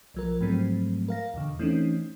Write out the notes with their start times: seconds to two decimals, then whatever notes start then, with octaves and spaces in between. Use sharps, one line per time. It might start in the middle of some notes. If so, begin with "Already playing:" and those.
0.14 B1 F3 A#4
0.41 G#2 F3 F#3 G#3 A3 C4
1.08 A#4 F5 A#6
1.34 E2 B2 D3
1.59 E3 A3 C4 C#4 D#4